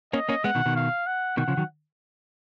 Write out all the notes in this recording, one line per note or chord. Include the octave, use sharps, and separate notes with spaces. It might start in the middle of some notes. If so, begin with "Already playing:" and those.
A#3 C#4 D#5
A#3 C#4
G#3 B3 F#5
B2 D#3
B2 D#3
F5
F#5
B2 D#3 F#5
C#3 F3
D#3 F#3